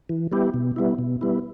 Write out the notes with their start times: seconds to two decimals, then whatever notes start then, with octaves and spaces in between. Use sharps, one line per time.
0.09 E3
0.32 G3 B3 E4 G4
0.54 B2
0.76 G3 B3 E4
0.99 B2
1.21 G3 B3 E4